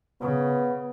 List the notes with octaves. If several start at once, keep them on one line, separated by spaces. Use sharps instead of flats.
C#3 B3